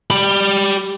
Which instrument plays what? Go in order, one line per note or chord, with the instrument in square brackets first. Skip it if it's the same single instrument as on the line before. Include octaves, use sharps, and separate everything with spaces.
[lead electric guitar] G4 B5